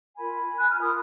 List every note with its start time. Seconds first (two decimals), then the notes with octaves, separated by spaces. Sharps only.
0.17 F4 A#4 G#5 B5
0.58 F#6
0.69 F6
0.79 F4 A#4 B5 D#6